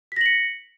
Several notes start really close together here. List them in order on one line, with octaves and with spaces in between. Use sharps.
B6 A#6 F#7 C#7